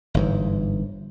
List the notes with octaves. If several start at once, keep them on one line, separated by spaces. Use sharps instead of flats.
G1 G#2 E3